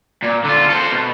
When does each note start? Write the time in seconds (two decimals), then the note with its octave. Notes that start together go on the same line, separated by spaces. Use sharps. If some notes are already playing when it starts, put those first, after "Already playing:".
0.22 A#2
0.44 D3 F4
0.69 A4 C5
0.92 B2